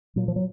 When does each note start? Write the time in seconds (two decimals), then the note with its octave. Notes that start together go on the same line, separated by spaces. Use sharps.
0.16 A#2 F#3
0.28 F3
0.36 F#3